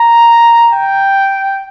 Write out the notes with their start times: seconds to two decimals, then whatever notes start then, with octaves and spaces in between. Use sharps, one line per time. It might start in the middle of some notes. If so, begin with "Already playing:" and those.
Already playing: A#5
0.72 G5